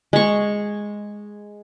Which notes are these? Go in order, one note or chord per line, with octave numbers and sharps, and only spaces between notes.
G#3 C#6